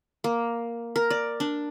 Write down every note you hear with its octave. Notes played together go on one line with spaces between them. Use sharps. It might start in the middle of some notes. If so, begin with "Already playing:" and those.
A#3
A#4
D5
D4